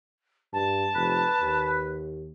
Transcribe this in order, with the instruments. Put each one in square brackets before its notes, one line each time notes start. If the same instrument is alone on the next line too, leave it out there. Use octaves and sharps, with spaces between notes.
[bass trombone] G2 [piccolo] A5
[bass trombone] F1 [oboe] B4
[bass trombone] D#2